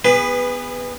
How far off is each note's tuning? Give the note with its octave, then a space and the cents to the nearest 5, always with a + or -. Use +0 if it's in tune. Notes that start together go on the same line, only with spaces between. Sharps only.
B3 +0 G#4 -35 B4 +10